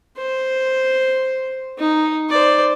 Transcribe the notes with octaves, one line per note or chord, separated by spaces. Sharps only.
C5
D#4
C5 D5